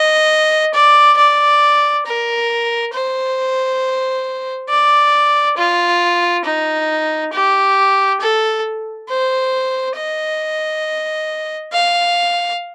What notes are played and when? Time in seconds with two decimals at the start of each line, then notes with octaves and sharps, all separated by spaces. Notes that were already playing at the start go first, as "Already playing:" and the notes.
Already playing: D#5
0.73 D5
1.17 D5
2.05 A#4
2.93 C5
4.69 D5
5.57 F4
6.44 D#4
7.33 G4
8.21 A4
9.09 C5
9.96 D#5
11.72 F5